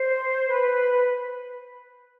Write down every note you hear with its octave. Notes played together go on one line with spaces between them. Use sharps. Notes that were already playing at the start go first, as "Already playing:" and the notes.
Already playing: C5
B4